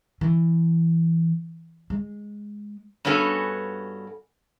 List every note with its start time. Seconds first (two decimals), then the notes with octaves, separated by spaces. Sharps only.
0.21 E3
1.90 G#3
3.05 G2 B3 C#4 F#4 A4 G#5